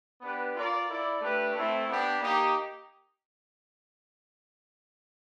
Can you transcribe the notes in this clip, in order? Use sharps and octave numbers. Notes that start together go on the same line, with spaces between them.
B3 D4 G4 B4
F4 A#4 D5
E4 A4 D5
A3 D4 G4 B4
A3 C4 E4 A4
B3 D4 G4
A#3 D#4 G4